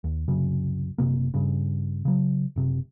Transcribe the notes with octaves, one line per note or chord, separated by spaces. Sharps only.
D#2
C2 F#2 C#3
F#1 F#2 C3 A#3
G2 C#3
C#3 F#3
F#1 C3